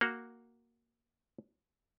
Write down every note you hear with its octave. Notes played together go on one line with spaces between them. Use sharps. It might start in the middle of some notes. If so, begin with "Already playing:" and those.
A#3 F#4